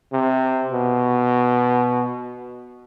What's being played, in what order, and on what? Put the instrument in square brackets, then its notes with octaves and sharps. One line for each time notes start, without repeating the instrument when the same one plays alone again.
[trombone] C3
B2